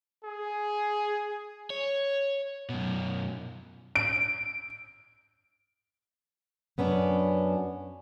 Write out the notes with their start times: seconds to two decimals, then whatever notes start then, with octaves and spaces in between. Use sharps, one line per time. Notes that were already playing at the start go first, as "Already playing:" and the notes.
0.23 G#4
1.70 C#5
2.69 F#2 B2
3.96 D7
6.78 F#2 B3 C#4 D4